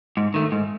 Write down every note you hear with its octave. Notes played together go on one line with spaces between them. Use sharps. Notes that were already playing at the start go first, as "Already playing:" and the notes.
G#2
D#3 A3
G#2